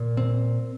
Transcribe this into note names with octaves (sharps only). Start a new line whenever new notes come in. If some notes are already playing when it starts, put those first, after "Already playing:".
Already playing: A#2
C4